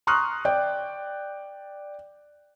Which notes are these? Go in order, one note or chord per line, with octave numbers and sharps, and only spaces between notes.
A#5 C6 C#6 D#6 F6 F#6
D5 G5